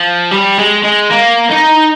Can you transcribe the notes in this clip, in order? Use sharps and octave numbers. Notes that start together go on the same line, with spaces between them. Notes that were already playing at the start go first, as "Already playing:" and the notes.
Already playing: F3
G3
G#3
G#3
A#3
D#4